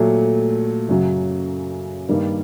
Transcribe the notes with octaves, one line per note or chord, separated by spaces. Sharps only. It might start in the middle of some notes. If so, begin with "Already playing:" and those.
Already playing: A#2 F#3 A3
F#2 C#3 F#3
G2 D#3 G3 A#3